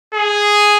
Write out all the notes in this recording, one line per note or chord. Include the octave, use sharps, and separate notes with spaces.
G#4